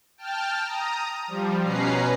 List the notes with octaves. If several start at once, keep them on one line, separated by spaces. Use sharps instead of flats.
G5 A5 F6
A#5 D#6
F3 G3
B2 C#4 B4 A#5 C7